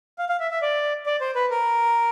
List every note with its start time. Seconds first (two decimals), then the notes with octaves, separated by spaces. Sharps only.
0.18 F5
0.29 F5
0.40 E5
0.51 E5
0.62 D5
1.06 D5
1.21 C5
1.35 B4
1.50 A#4